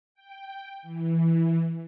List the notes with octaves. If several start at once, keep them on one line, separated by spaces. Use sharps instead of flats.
G5
E3